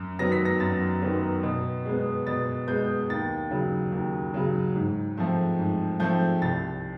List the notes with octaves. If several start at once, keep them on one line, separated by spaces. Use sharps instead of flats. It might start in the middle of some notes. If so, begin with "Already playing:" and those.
Already playing: F#2
D#3 F#3 B3 A#6
B6
A#6
F#2 A6
D#3 F#3 B3
B2
G#3 B3
B2 A6
G#3 B3 G6
D#2 A6
C#3 F#3
D#2
C#3 F#3
G#2
F3 A3 C4
G#2
F3 A3 C4 G6
C2 A6